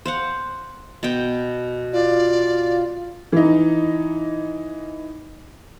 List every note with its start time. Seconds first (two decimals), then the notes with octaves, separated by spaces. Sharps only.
0.05 C5 F5 F#5
1.03 B2 G5
1.93 F4 D5
3.32 E3 D#4